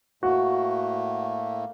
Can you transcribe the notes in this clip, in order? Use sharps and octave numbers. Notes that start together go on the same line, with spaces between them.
A2 A3 A#3 F#4